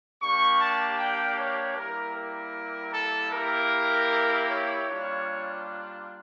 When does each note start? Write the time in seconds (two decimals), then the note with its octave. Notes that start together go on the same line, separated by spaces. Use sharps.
0.22 A#3 D4 G4 C#6
0.60 A5
0.99 G5
1.38 C#5
1.76 G3 A#3 E4 G4 A#4
2.16 A#4
2.93 A4
3.32 A#3 E4 G4 A#4
4.49 C#5
4.88 G3 A#3 D4 F4